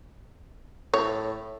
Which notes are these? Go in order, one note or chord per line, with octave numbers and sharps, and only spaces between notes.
A2 C#5